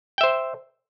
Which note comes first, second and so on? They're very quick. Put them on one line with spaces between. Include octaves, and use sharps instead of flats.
G5 E5 C5